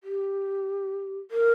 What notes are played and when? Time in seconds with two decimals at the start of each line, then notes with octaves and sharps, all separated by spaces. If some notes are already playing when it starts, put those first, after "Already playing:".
0.04 G4
1.31 A#4